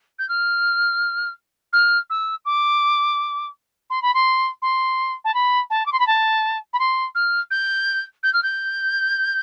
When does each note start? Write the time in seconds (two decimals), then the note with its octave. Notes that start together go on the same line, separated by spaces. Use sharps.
0.18 G6
0.28 F6
1.72 F6
2.09 E6
2.45 D6
3.90 C6
4.02 B5
4.14 C6
4.62 C6
5.24 A5
5.34 B5
5.70 A5
5.85 D6
5.92 C6
5.99 B5
6.07 A5
6.73 B5
6.79 C6
7.15 F6
7.50 G6
8.23 G6
8.33 F6
8.43 G6